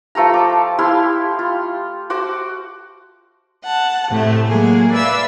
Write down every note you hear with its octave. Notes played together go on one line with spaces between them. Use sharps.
F3 A3 G4 A#5
D6
E4 G4 F5 C6
F4
F#4 C5 D6
F#5 A5
A2 C3 A3
F#3 G#3 A#3 G#4
B4 D5 E5 F5 E6